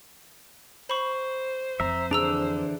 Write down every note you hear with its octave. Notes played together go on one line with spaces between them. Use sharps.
C5 B5 C#6
F2 E5 A#5
D3 E3 D4 G#4 A#5 E6